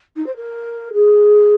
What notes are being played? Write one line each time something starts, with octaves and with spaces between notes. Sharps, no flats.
D#4
C5
A#4
G#4